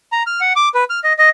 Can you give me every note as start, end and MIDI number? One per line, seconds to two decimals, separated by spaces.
0.12 0.23 82
0.27 0.40 89
0.41 0.53 78
0.56 0.69 86
0.74 0.84 71
0.90 1.00 89
1.04 1.13 75
1.19 1.29 75